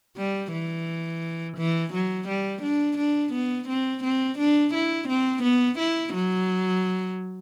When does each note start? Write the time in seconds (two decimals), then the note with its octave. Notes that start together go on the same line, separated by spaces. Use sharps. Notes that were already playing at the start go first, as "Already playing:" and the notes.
0.16 G3
0.52 E3
1.58 E3
1.93 F#3
2.28 G3
2.62 D4
2.97 D4
3.33 B3
3.68 C4
4.04 C4
4.38 D4
4.74 E4
5.09 C4
5.43 B3
5.79 E4
6.14 F#3